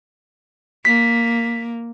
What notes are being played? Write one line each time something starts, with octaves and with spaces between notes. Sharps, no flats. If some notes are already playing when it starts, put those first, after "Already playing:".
A#3 B6